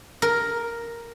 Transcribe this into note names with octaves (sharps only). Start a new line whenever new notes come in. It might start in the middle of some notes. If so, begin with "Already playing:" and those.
A#4